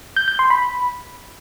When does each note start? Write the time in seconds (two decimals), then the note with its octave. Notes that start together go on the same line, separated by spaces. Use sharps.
0.16 G6
0.28 G6
0.39 C6
0.50 B5